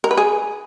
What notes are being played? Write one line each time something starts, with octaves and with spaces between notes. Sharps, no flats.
A#4
B4
G#4